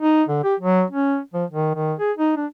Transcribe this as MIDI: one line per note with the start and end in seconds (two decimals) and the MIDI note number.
0.01 0.23 63
0.28 0.41 50
0.44 0.55 67
0.60 0.83 54
0.90 1.20 61
1.34 1.45 53
1.50 1.73 51
1.75 1.94 51
1.99 2.12 68
2.17 2.33 63
2.37 2.46 62